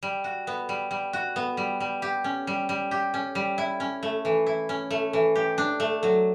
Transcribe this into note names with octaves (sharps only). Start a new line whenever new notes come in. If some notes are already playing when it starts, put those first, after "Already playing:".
G3
F#4
B3
G3
G3
F#4
B3
G3
G3
G4
C#4
G3
G3
G4
C#4
G3
E4
C#4
A3
E3
E4
C#4
A3
E3
G4
D4
A3
F#3